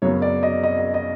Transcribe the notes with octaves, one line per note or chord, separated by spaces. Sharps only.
F#2 C#3 F#3 B3 C#5
D5
D#5
D#5
D#5
D#5